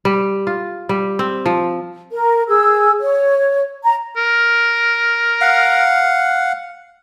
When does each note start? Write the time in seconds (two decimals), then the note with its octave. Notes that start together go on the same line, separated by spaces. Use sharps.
0.05 G3
0.47 F4
0.89 G3
1.19 C4
1.46 F3
2.12 A#4
2.48 G#4 E6
2.99 C#5
3.84 A#5
4.16 A#4
5.41 F5 F#5